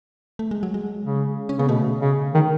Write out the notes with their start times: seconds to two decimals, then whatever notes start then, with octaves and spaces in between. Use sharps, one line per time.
0.39 A3
0.51 G#3
0.63 F#3
0.74 G#3
1.04 C#3
1.49 C#4
1.59 C#3 B3
1.69 B2 A3
2.01 C#3
2.34 D#3